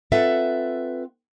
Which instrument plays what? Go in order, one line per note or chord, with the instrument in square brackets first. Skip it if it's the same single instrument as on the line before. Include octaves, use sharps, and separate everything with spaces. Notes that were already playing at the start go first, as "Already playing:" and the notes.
[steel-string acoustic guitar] C4 F4 A4 B4 E5 F#5